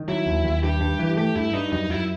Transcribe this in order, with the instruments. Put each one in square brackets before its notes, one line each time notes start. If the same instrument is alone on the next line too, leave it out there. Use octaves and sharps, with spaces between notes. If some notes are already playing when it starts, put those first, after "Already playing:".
Already playing: [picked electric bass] D#3
[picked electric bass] F#3 [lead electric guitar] E4
[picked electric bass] D#2
D#2
[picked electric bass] G2 [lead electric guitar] G4
[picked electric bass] G2
E3
[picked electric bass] A3 [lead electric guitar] G4
[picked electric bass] G2 [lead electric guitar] E4
[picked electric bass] G2 [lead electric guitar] D#4
[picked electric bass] F#2 [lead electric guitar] D#4
[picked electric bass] F#2 [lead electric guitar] E4